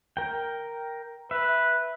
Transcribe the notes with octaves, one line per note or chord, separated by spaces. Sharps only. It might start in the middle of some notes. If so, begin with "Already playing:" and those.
A#4 G5
B4 E5